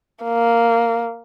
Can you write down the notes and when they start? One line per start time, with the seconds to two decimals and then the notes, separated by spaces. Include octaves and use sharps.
0.24 A#3